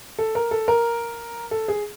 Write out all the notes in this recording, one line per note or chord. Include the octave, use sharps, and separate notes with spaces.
A4
A#4
A4
A#4
A4
G#4